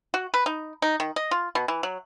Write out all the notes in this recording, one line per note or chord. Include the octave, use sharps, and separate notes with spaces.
F#4
B4
D#4
D#4
D#3
D#5
F4
B2
E3
F#3